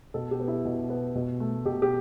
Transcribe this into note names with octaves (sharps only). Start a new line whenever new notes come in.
B2 A4
G4
B3
E4
B2
B3
B2
A3
B2 G4
G4